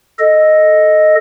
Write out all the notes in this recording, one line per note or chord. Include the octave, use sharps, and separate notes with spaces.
A4 D#5